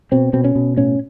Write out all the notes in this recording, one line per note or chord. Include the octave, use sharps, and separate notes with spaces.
B2 C4
B2 C4
C#4
B2
A2 C#4